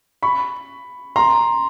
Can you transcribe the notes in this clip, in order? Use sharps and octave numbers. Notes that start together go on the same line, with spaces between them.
B5 C#6
A#5 C6